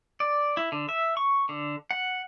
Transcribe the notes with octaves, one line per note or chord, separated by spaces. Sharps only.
D5
E4
D3
E5
C#6
D3
F#5